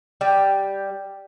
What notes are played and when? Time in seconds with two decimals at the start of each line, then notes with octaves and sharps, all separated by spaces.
0.21 G3